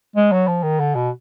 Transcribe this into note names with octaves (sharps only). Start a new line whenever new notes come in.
G#3
F#3
F3
D#3
D3
B2